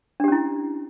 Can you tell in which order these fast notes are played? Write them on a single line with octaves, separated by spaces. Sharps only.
D4 G4 C#4 E4